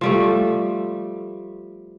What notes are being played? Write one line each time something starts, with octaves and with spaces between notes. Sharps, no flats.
F3 G3 A3